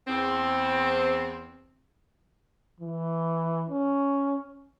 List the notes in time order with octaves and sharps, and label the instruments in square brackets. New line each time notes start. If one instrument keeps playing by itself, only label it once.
[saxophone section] E2 C4
[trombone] E3
C#4